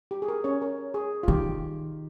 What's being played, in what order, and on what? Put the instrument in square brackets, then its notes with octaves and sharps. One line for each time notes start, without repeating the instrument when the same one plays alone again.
[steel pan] G4
G#4
A#4
C#4 C#5
A#4
G#4
F4
[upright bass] D#3 [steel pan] G4